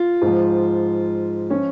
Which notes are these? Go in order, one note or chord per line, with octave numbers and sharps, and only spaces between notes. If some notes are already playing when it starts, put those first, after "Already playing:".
Already playing: F4
G#2 F3
F3 C#4